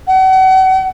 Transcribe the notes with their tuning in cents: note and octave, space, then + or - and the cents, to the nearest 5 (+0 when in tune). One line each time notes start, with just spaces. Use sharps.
F#5 +40